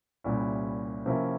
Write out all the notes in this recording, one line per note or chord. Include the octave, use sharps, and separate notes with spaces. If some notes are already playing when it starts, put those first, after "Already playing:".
C2 A#2 G3 C#4 E4
C3 F3 A#3 C#4 E4